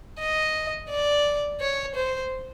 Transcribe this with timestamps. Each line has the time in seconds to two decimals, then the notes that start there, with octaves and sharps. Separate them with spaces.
0.19 D#5
0.89 D5
1.61 C#5
1.95 C5